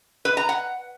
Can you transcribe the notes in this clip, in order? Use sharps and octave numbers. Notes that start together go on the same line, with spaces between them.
B4
A#5
F#5